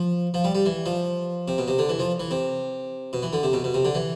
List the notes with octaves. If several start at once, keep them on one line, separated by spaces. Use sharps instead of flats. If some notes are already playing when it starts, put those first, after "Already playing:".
Already playing: F3
F3
G3
G3
E3
F3
C3
B2
C3
D3
E3
F3
E3
C3
B2
E3
D3
C3
B2
B2
C3
D3
E3